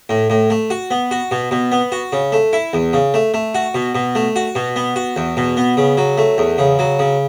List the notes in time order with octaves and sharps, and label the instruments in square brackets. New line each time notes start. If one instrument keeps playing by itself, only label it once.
[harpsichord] A2
A2
A3
F#4
B3
F#4
B2
B2
B3
F#4
C#3
A3
E4
E2
C#3
A3
A3
F#4
B2
B2
A3
F#4
B2
B3
F#4
E2
B2
B3
C#3
F#3
A3
E2
C#3
F#3
C#3